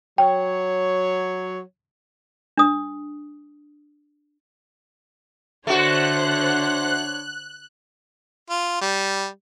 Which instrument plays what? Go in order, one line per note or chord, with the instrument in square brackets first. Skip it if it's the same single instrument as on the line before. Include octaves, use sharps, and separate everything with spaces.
[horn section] F#3 C#5 [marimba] G5
[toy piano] D4 D#6
[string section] D3 C5 F#5 [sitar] A3 F#4 [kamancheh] D4 C#5 [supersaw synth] F#6
[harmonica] F4
G3